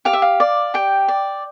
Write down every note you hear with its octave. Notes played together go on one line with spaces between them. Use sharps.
G4 F5
E5
F5
D5
G4 G5
D5